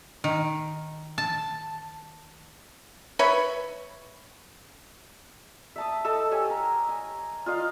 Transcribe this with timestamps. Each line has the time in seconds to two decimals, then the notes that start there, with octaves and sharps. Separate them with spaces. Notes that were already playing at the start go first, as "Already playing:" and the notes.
0.24 D#3
1.18 A5
3.19 B4 C#5 E5 B5
5.76 E5 A5 D#6
6.05 A4 D#5 E6
6.31 G4 C#5 G#5
6.50 A#4
6.89 G#5
7.46 F4 D#5 F5